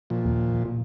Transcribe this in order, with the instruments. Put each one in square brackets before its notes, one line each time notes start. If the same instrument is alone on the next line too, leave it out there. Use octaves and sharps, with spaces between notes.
[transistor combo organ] A#2 F3
[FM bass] D#2
A#2